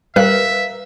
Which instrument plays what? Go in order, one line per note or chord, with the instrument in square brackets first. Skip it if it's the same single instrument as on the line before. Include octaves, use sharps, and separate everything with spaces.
[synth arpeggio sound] G3 F#6 [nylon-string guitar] A#4 F5 [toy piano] B4 [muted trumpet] E5